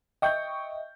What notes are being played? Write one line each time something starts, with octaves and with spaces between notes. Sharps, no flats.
D#5 E5 G5 C#6 G6